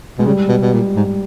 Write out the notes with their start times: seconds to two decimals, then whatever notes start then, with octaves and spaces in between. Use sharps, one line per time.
0.18 B2 G#3
0.26 C#3 G3
0.48 B2
0.62 B2
0.73 A#2
0.96 G#2